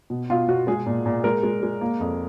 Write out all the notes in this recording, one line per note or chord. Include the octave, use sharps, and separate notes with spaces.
B2
B2 F4
B2 F#4
G#3 G#4
A#2
A#2
G#3 A#4
G#3
G#3
A#3
F2